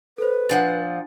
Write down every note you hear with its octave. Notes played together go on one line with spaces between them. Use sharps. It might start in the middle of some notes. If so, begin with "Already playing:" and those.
A4 B4 C5
A#2 F3 D4 F#5 G#5 A6